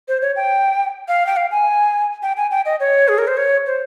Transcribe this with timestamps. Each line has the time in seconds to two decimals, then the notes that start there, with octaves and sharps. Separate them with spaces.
0.08 C5
0.22 C#5
0.36 G5
1.08 F5
1.27 G5
1.36 F5
1.51 G#5
2.23 G5
2.37 G#5
2.51 G5
2.66 D#5
2.80 C#5
3.08 G#4
3.18 A#4
3.28 C5
3.37 C#5
3.66 C5